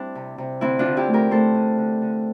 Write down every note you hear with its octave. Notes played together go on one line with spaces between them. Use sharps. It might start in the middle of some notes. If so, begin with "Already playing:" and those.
Already playing: G3 C4 D4 E4
C3
C3
D3 C4 E4
D4 F4
D3
E4 G4
A3
G4 A#4
A3 A4 C5
D3
D3
D3